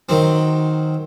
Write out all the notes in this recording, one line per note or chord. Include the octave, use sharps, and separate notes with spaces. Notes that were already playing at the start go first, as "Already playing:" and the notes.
D#3 F#3 C4